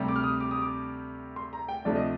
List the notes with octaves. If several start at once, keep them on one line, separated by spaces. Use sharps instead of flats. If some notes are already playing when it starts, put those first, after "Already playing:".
Already playing: D2 C3 G3
D6
F6
D#6
D6
D#6
D6
C6
A#5
G5
D2 C3 F3 A3 D4 D5
D#5